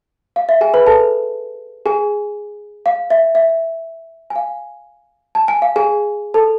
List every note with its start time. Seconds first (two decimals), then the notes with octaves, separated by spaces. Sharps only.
0.36 F5
0.49 E5
0.61 G#4 G#5
0.74 B4 B5
0.86 A4 A5
1.86 G#4 G#5
2.86 F5
3.10 E5
3.35 E5
4.30 G#5
4.36 F5
5.35 A5
5.48 G#5
5.62 F5
5.76 G#4 G#5
6.34 A4 A5